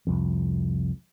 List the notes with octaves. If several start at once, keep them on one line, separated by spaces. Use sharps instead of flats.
C2 F2